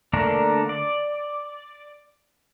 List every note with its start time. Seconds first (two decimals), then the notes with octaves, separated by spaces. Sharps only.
0.13 D3 A3 A#3 D4 A#4
0.69 D5